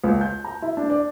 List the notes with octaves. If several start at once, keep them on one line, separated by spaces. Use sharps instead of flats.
C#2
G6
A#5
E4
D4
D5